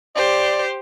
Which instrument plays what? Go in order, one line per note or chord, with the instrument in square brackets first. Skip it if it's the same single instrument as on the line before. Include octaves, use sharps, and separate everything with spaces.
[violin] G4 C5 [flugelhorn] D5